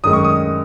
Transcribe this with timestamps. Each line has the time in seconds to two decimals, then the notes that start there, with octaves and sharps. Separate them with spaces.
0.04 F#2 D#3 G#3 D#6
0.13 C#6
0.24 D#6